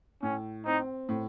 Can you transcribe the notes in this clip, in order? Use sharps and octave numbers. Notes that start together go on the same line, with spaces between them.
A2 C#4
C4 D#4
A2